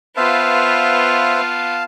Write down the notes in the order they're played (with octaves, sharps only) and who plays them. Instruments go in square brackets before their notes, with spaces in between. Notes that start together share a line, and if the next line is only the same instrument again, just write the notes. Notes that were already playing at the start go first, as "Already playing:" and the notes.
[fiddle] B3 F4 [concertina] B4 C5 E5 [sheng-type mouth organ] F5 A5